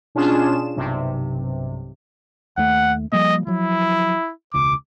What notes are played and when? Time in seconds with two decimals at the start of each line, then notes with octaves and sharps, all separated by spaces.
0.15 B2 C#4 D4 F4 G#4 E7
0.76 B1 G2 C3
2.57 D#2 A3 F#5
3.12 F3 G3 A#3 D#5
3.47 F3 F#3 E4
4.54 E1 C#2 C#3 D6